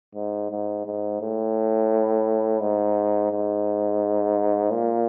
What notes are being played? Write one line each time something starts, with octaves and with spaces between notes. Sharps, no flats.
G#2
G#2
G#2
A2
G#2
G#2
A#2